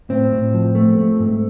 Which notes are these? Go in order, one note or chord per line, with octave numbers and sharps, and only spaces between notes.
A2 C4
A2
F3
A3
A3
G#2